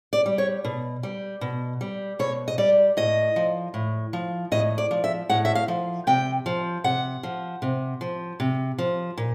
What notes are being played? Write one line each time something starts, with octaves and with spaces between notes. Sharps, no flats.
D5
G3
C#5
B2
G3
B2
G3
B2 C#5
D#5
G3 D5
A2 D#5
F3
A2
F3
A2 D#5
D5
F3
E5
A2 F#5
E5
F5
F3
C3 G5
F3
C3 F#5
F3
C3
F3
C3
F3
A#2